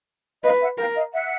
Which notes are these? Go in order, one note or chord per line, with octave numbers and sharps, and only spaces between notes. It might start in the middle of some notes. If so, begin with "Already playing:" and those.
B4 D#5 F5
E5 F#5
A#4 F5 G5
D#5 F5
E5 F#5